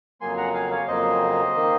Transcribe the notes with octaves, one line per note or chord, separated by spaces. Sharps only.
F2 C#3 F#3 A#3 G#5 C6
F#5 A#5
F5 G#5
C#5 F5
F2 C#3 F#3 A#3 C5 D#5
D#3 A#3